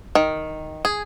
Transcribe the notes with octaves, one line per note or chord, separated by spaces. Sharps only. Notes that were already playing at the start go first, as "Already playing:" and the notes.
D#3
G#4